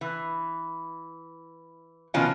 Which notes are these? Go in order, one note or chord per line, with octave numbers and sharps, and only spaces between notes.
E3
B2 D#3 F3 C#4 F4